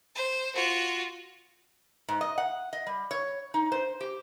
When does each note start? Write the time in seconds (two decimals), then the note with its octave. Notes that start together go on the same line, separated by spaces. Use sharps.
0.15 C5
0.55 F4 F#4
2.08 G#2
2.21 D#5
2.38 F#5
2.73 D#5
2.86 G3
3.11 C#5
3.54 D#4
3.72 C5
4.01 G4